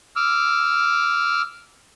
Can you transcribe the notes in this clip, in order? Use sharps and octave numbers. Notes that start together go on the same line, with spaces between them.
D6 E6 F6